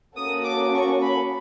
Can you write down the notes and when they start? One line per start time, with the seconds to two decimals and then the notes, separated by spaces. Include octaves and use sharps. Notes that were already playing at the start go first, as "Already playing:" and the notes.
0.17 A#3 C#4 F#4 A4 D#6
0.45 D6
0.74 C#6
1.02 B5